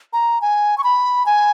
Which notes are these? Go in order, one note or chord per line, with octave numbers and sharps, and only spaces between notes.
A#5
G#5
C#6
B5
G#5